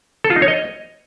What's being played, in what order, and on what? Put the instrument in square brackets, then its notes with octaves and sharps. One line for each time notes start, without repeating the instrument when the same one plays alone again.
[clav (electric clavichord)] A4
F4
D#4
C#5
D#5